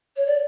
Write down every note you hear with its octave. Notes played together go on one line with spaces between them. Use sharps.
C#5
D5